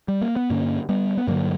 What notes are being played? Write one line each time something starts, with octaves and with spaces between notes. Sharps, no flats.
G3
A#3
B3
G2 D3 A#3 C#4
G3 B3
B3
G2 D3 F#3 A#3